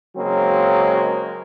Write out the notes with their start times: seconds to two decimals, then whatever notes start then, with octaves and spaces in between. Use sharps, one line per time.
0.16 C#3 F#3 G#3 A#3 C4